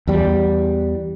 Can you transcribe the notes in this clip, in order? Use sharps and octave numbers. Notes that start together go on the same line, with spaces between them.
E2 G3